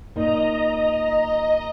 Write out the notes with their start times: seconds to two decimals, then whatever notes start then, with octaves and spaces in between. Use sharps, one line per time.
0.16 A#2 D#4 C5 D#5 A#5